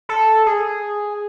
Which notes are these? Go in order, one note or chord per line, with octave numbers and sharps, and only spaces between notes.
A4
G#4